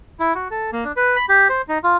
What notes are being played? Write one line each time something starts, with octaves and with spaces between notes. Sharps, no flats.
E4
F#4
A4
A#3
D4
B4
B5
G4
C5
D#4
F4